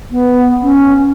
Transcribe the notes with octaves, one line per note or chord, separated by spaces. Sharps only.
B3
C#4